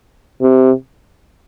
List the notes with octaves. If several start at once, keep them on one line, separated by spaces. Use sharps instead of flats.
C3